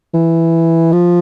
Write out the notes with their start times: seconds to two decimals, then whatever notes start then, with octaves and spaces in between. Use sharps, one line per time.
0.14 E3
0.92 F3